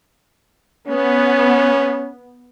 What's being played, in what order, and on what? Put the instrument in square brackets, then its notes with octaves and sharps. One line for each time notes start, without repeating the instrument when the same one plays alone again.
[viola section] B3 [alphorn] C#4